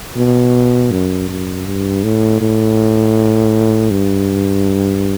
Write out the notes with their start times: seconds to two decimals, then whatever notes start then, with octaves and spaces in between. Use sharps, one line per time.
0.16 B2
0.91 F#2
1.29 F#2
1.66 G2
2.03 A2
2.41 A2
3.91 G2